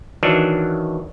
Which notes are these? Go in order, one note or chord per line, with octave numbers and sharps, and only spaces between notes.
D#3 E3 F#3 D4